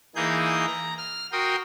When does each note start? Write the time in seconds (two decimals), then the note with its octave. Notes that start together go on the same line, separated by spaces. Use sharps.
0.16 E3 A#3 D#4 G#4 G6
0.66 A#5
0.97 F6
1.32 F#4 A#4 G5 C6 D#6